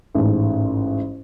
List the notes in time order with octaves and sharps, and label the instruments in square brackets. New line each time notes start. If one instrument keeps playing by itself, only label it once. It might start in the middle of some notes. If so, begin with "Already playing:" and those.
[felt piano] A1 G#2